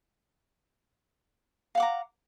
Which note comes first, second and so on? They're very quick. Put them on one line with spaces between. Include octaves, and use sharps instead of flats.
F5 F#5 D6 A#5